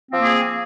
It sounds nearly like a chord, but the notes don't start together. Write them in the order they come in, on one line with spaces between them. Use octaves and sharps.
C4 F3 A#3 G#4